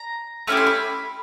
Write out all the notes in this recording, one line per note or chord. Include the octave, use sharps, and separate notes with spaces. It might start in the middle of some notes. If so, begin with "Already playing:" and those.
Already playing: A#5
A3 C#4 E4 G4 B5
C6
B5